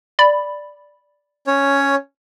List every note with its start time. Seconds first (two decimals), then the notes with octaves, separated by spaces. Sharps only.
0.19 D5 B5
1.47 C#4 C#5